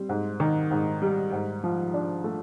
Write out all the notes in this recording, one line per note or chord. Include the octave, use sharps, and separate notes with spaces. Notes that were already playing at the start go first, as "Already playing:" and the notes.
Already playing: G3 C4
G#2
D#3
G#2
G3
G#2
F3
D4
A3